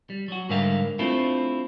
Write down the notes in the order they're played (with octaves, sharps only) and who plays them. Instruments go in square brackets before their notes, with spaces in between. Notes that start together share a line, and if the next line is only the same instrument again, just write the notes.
[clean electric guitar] G3
F#3 F#4
G#2 D3 G3 A#4 E5 F5
A3 C4 D4 E4 F4